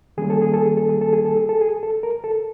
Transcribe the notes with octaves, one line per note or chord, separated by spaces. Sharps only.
D#3 G3 A#3 C#4 G#4
A4
G#4
A4
G#4
A4
G#4
A4
G#4
A4
G#4
A4
G#4
A4
A#4
A4